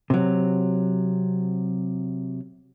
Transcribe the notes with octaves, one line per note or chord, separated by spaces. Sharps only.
C3 F#3